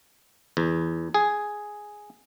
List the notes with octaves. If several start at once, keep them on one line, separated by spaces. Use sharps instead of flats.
E2
G#4